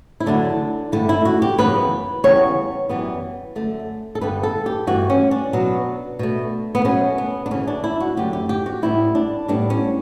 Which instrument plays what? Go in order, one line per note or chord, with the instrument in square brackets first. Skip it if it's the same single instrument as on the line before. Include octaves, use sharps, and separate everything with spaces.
[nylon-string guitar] E4
E2 D3 F#3 A3 D4
G2 D3 A3 E4
E4
F#4
G4
F#2 C#3 E3 B3 B4
E2 C#3 G3 B3 C#5
F#2 E3 G3 B3
F#2 D3 A3
A4
G2 D3 G3 B3 B4
A4
G4
G2 E3 A3 F#4
C#4
D4
B2 F#3 B3
B2 A3
B3
B2 F#3 A3 C#4
B3
D4
D2 C#3 E3 C#4
D4
E4
F#4
F#2 D3 A3 G4
G4
G4
F#4
A2 G3 B3 E4
D4
A2 G3 B3 D4
C#4